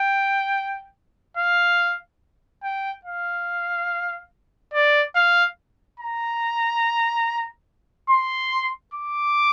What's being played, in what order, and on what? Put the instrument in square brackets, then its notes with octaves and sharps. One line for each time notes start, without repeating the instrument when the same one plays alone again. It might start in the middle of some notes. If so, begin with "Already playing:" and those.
Already playing: [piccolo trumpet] G5
F5
G5
F5
D5
F5
A#5
C6
D6